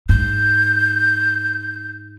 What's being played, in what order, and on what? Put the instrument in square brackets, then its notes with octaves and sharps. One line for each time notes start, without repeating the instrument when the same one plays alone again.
[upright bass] G#2 [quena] G6